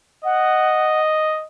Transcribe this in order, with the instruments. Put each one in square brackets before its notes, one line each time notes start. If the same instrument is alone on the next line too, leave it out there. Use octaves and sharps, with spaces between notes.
[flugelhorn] D#5 [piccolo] F#5